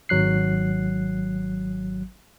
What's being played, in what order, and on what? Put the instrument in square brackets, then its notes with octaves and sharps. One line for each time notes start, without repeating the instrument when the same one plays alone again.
[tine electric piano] G#1 F#3 F#6 C7